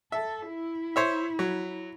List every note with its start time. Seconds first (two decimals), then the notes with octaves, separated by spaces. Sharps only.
0.12 A4 E5
0.48 E4
0.96 C5 C#5 E5
1.39 F#3